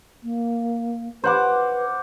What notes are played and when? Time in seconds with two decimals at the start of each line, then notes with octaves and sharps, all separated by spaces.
0.24 A#3
1.24 B4 C5 F#5 D6